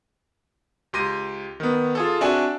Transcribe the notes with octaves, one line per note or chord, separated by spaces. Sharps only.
C#2 G4 C6 A#6 D#7
D#3 B3
F4 G#4 A4
C4 D4 F#4 D5 E5 G#5